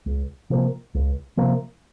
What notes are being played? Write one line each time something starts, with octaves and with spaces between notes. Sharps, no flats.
C#2
C3 F3 A#3
C#2
C3 F3 A#3